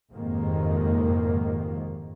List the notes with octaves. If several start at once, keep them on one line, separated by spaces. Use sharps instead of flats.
F#1 F2 G#2 C3 D#3 A#3